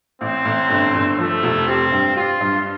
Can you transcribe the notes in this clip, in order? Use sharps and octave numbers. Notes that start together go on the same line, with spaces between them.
A1 C4
A1
G1
G1
F3 A3
F1
C4 G4
G2
F4 G4
G2